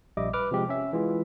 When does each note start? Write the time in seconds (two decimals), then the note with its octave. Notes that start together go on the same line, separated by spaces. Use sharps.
0.17 A#1 G3 D#5 E5 D6
0.33 B4 D6 F6
0.51 C3 F3 G#3 G4
0.69 C#4 E5
0.93 E3 G#3 F4